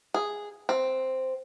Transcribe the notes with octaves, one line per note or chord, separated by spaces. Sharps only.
G#4
C4